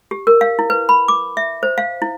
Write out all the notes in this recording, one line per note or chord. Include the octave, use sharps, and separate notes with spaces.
G4
A#4
F5
E4
B4
B5
D6
E5
C5
F5
E4